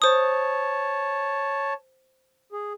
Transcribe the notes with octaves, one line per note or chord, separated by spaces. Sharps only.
C5 C#5 A5 D#6
G#4